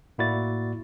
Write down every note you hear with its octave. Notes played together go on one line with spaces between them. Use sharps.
A2 A#3 E4 F#4 D5 A6